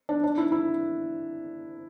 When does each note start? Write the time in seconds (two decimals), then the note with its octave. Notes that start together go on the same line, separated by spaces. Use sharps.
0.09 D4
0.24 D4
0.38 E4
0.52 E4